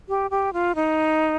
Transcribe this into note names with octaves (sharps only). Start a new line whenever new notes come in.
G4
G4
F4
D#4